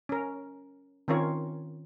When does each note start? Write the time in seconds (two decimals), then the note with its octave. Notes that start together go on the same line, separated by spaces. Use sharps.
0.09 C#4 A#4
1.08 D#3 C4 C#4 F4 A#4 C#5